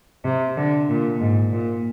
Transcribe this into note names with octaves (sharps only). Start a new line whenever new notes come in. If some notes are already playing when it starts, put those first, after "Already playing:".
C3
D3
A#2
G#2
A#2